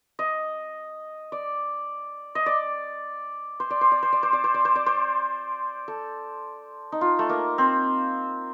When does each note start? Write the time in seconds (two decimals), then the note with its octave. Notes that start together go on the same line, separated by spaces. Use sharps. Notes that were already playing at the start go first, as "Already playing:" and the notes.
0.19 D#5
1.32 D5
2.35 D#5
2.46 D5
3.60 C5
3.70 D5
3.81 C5
3.92 D5
4.03 C5
4.13 D5
4.23 C5
4.33 D5
4.44 C5
4.54 D5
4.65 C5
4.76 D5
4.86 C5
5.88 A4
6.92 D#4
7.01 F4
7.19 A3
7.29 A#3
7.58 C4